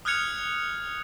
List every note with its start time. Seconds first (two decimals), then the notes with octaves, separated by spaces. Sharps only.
0.05 D#6 F6 F#6 G#6 C#7 F7